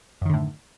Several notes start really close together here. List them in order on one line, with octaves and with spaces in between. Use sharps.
F#2 D#3 D3 A2